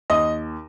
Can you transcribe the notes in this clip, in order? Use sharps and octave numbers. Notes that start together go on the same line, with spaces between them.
D#2 D#5